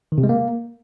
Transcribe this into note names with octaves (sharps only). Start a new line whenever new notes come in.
D#3
C3
G#3
A#3